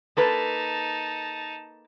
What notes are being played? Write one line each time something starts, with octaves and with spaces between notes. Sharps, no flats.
A#3 D#4 A4 B4 A5